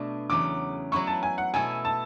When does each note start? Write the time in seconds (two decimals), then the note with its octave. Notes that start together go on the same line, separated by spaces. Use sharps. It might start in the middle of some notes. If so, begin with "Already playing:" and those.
Already playing: B2 A3 D4
0.30 E2 C#3 F#3 D6
0.92 F#3 B3 E4 C#6
1.07 A5
1.23 G#5
1.38 F#5
1.54 B2 A3 E4 A4 G#5
1.85 A5